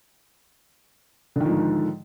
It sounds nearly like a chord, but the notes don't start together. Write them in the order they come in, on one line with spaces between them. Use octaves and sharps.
D3 D#3 F3 G#2